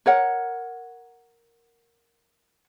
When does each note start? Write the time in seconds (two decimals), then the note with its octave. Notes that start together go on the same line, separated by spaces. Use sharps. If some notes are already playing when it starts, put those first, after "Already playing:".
0.06 A#4 C#5 F#5